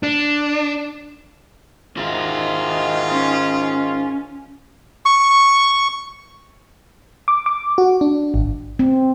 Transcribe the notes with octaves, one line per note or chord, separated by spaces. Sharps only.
D4
G#2 D#3 F4 F#4 E5
C#4
C#6
D6
D6
F#4
D4
G#1
C4